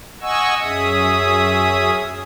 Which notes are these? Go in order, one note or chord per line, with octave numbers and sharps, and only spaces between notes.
D#5 F#5 G#5 C#6 E6
F#2 C#4 G#4 E5 D#6